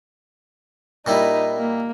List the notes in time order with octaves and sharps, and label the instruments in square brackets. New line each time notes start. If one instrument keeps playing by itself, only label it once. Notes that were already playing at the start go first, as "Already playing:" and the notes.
[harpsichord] A#2 G3 E4 [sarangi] D#4
[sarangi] A#3